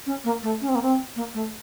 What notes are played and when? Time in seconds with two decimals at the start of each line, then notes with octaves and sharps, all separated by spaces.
0.06 C#4
0.24 A#3
0.43 A3
0.61 C#4
0.69 C4
0.75 A#3
0.82 C4
1.16 A#3
1.34 A3